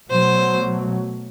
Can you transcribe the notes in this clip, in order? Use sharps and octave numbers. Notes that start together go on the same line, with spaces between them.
B2 F#3 A3 C5